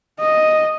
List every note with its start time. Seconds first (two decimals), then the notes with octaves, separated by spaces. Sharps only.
0.20 D#5